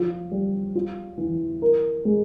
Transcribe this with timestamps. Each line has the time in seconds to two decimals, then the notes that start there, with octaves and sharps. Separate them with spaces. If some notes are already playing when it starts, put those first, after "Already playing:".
Already playing: F3 F4
0.31 G3
0.75 F4
1.18 E3
1.62 A#4
2.05 G#3